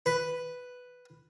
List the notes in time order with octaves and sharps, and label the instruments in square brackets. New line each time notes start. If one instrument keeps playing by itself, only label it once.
[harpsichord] B4